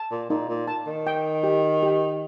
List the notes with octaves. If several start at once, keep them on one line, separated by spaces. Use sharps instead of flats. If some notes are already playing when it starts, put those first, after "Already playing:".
Already playing: A5
A#2
A#2 D#4
A#2
A5
D#3
G5
G4
G4